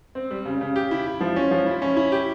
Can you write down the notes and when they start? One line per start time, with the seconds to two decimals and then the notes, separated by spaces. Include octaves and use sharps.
0.15 C4
0.31 G3
0.45 C#3
0.61 C#3
0.76 G4
0.91 E4
1.06 E4
1.21 F3
1.36 C#4
1.51 F3
1.66 E4
1.82 C#4
1.97 E4
2.12 G4